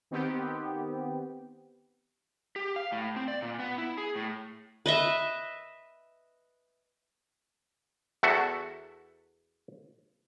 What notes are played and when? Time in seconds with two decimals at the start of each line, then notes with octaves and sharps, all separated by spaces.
0.11 D#3 B3 C4 G4
2.56 G4
2.76 F5
2.92 A2
3.16 C4
3.28 D5
3.42 A#2
3.59 B3
3.78 E4
3.98 G#4
4.16 A2
4.86 B4 D#5 E5
8.23 E2 F#4 A4 E5